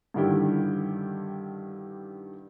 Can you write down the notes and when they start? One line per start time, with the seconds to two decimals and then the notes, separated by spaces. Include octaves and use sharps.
0.14 G2 D3 D#3 E4 G4